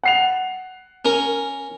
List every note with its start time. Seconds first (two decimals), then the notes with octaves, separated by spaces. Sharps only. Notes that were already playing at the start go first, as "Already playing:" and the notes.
0.03 F#5 C7 F7
1.05 C#4 A#4